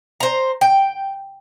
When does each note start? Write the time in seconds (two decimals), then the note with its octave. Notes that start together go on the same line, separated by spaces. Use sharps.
0.20 C5 A#5
0.61 G5